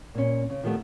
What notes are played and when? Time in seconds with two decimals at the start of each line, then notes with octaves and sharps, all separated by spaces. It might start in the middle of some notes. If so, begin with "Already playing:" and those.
0.15 A#2 C#4
0.50 C#3
0.63 D#3 F3 G3 A3 B3